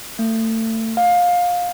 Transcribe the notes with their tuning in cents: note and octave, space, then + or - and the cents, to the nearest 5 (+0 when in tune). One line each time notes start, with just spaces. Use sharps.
A3 +30
F5 +20